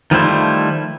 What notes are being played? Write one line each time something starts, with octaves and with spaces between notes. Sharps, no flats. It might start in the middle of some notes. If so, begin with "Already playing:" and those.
D#3 F3 G3 A3 E4 C5